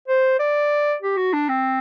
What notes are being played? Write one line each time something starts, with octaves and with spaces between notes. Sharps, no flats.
C5
D5
G4
F#4
D4
C4